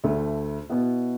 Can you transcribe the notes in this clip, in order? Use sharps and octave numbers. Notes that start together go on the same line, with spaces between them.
D2 D3 A3
B2 B3 E4